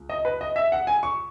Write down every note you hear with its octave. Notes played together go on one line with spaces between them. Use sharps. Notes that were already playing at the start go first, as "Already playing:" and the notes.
Already playing: C#2
D#5
B4
D#5
E5
F#5
G#5
C#6